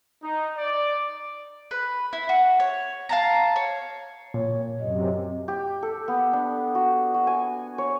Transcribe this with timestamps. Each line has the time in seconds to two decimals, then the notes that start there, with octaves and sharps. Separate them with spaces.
0.23 D#4
0.58 D5
1.71 B4
2.13 E4
2.29 F#4
2.60 C#5
3.09 F5 A5 A#5
3.56 C#5
4.34 A#2 C#5
4.80 F#2 C3 D#5
5.48 G4
5.82 A4
6.08 B3
6.33 D4
6.75 F#4
7.14 F#4
7.27 G#5
7.78 C#5